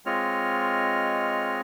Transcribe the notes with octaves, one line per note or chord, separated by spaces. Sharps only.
G#3 C4 F4 C#5 D#5 F6